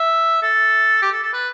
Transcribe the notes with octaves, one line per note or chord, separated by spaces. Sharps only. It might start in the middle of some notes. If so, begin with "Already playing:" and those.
Already playing: E5
A4
G4
A4
A4
B4